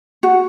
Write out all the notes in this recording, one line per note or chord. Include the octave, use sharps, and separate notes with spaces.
F#4